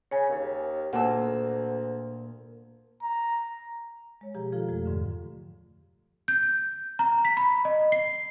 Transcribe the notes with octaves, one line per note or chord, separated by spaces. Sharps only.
C#3 C#5 G#5
D#2
D2 A#2 F#5 A5 E6
A#5
G#3 C#5
B2 F3 G4 G#4 A#5
D#3 F3 F4 A4 F5
F2 F3 A3 G4
D#2 G#2 D3
G6
A#5
B6
B5
D#5
C7